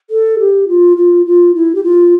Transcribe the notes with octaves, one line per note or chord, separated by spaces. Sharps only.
A4
G4
F4
F4
F4
E4
G4
F4